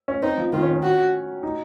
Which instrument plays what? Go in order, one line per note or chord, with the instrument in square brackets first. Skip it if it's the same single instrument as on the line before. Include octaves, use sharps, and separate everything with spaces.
[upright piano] C#4
[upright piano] C4 [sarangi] D#4
[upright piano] F3
[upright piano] D#3 [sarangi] F4
[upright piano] C#4
C#4
[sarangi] F#4
[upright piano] D#4